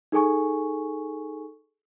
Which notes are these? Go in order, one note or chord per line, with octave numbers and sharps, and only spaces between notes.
D#4 G#4 A4 G#5 C#6